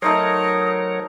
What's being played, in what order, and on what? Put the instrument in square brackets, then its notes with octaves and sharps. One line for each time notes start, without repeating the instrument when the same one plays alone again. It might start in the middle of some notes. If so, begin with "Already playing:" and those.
[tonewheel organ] F#3 A#4 C#5 [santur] A3 D#4 C5 [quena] D#6